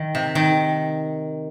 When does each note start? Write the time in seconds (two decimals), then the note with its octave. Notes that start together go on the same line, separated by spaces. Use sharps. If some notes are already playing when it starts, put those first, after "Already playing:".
Already playing: D#3
0.15 C3
0.35 D#3